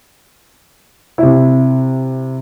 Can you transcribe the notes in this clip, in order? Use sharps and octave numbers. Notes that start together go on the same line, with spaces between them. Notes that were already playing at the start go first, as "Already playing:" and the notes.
C3 E4